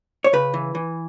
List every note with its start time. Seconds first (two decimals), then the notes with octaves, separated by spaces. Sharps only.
0.24 C#5
0.33 C#3 B4
0.54 E3
0.75 E3